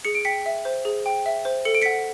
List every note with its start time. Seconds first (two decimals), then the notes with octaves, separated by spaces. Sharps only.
0.05 G#4 C#7
0.15 D7
0.25 G5 B6 C#7
0.46 E5
0.65 C5
0.85 G#4
1.06 G5
1.26 E5
1.45 C5
1.65 A4 C#7
1.74 D7
1.82 F#5 B6 C#7